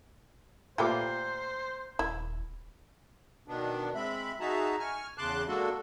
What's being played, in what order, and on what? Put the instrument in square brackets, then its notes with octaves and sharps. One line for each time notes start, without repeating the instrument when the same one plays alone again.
[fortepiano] A#2 G5 D6 [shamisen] A3 G4 B4 [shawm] C5
[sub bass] D#1 [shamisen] E4
[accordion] B2 D#3 B3 D4
G#3 C4 E5 B5
D#4 F#4 G#4 E5 A5 A#5
G#5 C#6 F6
E2 C#3 A5 C6 D6 F#6
G#3 A#3 D4 F#4 A4